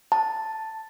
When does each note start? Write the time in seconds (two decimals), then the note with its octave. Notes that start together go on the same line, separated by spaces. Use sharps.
0.12 A5